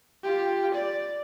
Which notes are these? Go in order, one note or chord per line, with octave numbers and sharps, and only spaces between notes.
F4 G4
D5